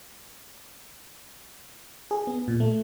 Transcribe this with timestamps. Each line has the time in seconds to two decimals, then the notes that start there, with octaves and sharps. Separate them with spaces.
2.11 G#4
2.27 B3
2.48 A#2
2.60 A3